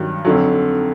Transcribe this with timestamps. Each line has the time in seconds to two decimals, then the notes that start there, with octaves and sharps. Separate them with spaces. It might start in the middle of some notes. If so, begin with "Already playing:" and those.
Already playing: G2 D#3 F#3
0.25 F2 D3 F#3